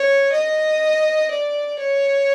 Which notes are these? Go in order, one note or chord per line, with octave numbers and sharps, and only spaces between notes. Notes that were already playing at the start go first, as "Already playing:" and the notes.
Already playing: C#5
D#5
D5
C#5